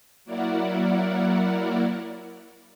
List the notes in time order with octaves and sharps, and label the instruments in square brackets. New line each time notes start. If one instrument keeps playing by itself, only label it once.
[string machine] F#3 A#3 E4 A#4 D5 F#5